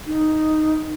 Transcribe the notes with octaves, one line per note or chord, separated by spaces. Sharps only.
D#4